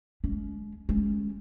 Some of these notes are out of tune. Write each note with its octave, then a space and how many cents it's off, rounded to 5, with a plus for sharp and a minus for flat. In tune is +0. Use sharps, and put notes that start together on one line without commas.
G#3 +10 C#4 +40
G#3 +0 C#4 +0